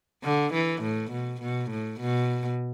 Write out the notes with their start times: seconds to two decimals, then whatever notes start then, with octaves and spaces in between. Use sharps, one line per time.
0.24 D3
0.53 E3
0.82 A2
1.11 B2
1.41 B2
1.70 A2
2.01 B2